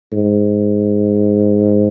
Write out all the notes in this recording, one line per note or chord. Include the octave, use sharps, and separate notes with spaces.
G#2